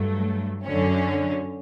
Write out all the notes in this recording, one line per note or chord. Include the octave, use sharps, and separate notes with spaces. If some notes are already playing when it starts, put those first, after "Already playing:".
Already playing: G2 F#3 A3
F#2 D3 F#3 C#4